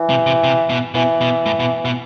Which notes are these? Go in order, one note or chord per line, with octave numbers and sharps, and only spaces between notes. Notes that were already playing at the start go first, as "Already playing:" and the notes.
Already playing: E3
C3
C3
C3
B2
B2 E3
B2
A2
B2
B2